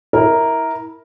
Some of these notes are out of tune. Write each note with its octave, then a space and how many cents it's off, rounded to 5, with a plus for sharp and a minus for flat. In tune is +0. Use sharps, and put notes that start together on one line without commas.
E4 -25 A#4 +0